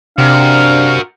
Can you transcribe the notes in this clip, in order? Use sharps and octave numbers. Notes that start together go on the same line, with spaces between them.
C3 D4 F#4 A#4 F5